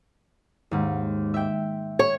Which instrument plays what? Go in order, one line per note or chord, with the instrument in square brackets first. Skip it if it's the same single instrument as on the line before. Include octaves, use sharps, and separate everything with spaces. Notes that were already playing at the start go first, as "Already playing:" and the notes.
[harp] D#2 G#2
E5 G5
[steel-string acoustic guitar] C#5